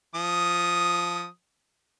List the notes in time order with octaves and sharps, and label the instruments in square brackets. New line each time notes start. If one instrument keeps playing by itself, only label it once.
[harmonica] F3 D#6